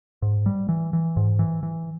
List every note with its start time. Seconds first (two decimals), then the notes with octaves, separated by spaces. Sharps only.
0.22 G#2
0.46 G3
0.69 E3
0.93 E3
1.17 G#2
1.39 E3
1.63 E3